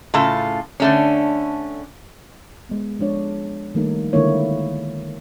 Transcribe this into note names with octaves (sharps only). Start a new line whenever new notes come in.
A2 C#3 F4 A4
D3 A3 C#4
G#3 B3
F3 G#3 D4 C#5
D#3 F3 G3 A3 A#3 D#4
D3 D#3 G#3 A#3 E4 C#5